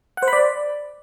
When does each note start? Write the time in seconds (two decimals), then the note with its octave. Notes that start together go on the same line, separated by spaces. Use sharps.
0.17 F#5
0.22 C5
0.28 B5
0.33 D5